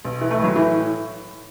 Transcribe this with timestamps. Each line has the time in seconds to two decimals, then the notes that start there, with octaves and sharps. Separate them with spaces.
0.05 B1
0.21 E3
0.31 A3
0.39 A2 F#3
0.56 A2 E3